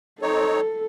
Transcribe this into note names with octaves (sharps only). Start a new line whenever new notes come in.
C4 D#4 A4 C#5